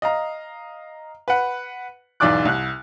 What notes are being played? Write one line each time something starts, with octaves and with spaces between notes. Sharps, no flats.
D#5 F5 A#5
B4 F#5
B1 E2 G#2 D5 D6 F#6
C2 F#6